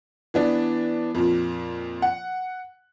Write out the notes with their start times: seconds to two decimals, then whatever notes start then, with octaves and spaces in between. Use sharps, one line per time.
0.34 E3 B3 D4
1.15 F2 A#2
2.02 F#5